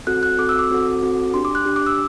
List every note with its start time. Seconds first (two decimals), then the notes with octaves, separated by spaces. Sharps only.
0.07 C4 F#4 A4 F#6
0.23 F#6
0.38 C4 F#4 A4 D6
0.49 E6
0.59 D6
0.70 C4 F#4 A4
1.02 C4 F#4 A4
1.33 D4 G4 C6
1.45 D6
1.55 F#6
1.66 D4 G4
1.76 D6
1.87 E6